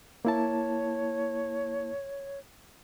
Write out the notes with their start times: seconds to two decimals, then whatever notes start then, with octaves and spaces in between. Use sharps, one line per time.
0.25 A#3 E4 C#5 A5